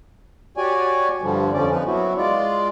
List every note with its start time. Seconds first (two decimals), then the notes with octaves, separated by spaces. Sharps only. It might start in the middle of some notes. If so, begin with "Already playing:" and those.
0.57 F#4 G4 C#5 D5 G#5
1.22 G2 D3 F3 G3
1.53 F2 D3 F3 C#4 D5
1.71 F3 D#4 B4
1.86 F#3 B3 E4 F#4
2.17 G#3 F4 D5